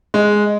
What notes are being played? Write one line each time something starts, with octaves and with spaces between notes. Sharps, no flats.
G#3